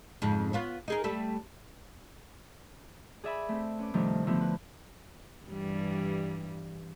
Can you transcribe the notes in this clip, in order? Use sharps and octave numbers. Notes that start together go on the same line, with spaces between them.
F2 G#2 C#3
B3 F4 C#5
D#4 G#4 A#4
G3 A3 A4
G#4 D5 E5 G#5 B5
A3 C4
C#4 B4 D6
G2 C3 D#3 F3 G3 A3
D3 F3 A3 B3 E4
B4
G2 E3 G3